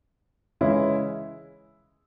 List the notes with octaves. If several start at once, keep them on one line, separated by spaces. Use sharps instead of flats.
C#3 E3 G#3 C#4 E4